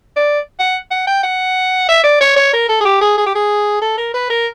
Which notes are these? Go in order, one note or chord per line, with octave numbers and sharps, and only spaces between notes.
D5
F#5
F#5
G5
F#5
E5
D5
C#5
C#5
A#4
A4
G#4
G4
G#4
G#4
G4
G#4
A4
A#4
B4
A#4